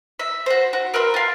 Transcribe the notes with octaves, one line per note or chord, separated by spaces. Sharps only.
E5
F#4 C5
F#4
A#4 B4 E5 C6
F4 F5